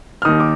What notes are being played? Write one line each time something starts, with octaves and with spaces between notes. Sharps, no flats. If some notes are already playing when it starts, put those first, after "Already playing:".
F6
D#2 D#3 D#6
D6